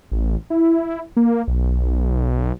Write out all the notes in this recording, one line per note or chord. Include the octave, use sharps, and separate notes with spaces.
A1
E4
A#3
B1